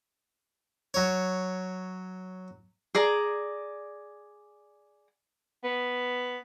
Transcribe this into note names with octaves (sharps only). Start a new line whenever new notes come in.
F#3 C#5
G#4 D5 A#5
B3